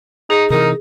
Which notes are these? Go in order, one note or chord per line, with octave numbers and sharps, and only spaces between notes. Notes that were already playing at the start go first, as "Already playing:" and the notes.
D#4 G#4
C3 E3 D#4 A#4